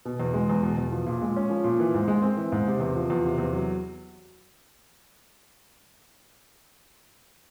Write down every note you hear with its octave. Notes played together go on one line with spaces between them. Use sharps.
B2
E2
G#3
E2
B2
E2
F3
A#2
G#3
C#4
F3
A#2
E3
G#2
G#3
C4
E3
G#2
C3
E2
F3
E2
C3
E2
F#3